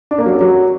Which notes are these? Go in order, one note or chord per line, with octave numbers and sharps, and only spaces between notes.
D4
A#3
F#3
C#4
F#3